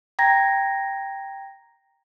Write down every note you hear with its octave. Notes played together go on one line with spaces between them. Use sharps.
G5 A#5 G#6 A#6